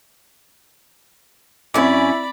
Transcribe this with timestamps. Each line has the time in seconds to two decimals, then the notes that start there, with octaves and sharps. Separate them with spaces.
1.74 F#2 C4 C#4 E4 D5 B5 D6